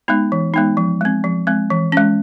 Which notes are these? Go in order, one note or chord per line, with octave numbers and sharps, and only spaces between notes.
G#3 B3 D#4
E3
G#3 B3 D#4
F3
G#3 C4
F3
G#3 C4
E3
G#3 C#4